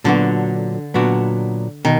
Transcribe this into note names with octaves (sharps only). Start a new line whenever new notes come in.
A#2 D3 F#3 B3 D4 F#4
A#2 F#3 B3 D4 F#4
B2 D#3